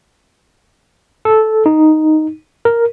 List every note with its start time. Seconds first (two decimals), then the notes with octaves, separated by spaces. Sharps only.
1.25 A4
1.66 D#4
2.65 A#4